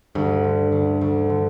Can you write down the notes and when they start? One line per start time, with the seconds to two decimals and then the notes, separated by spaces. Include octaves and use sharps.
0.15 D2 G2
0.44 D3
0.72 D2
1.01 D2
1.30 D3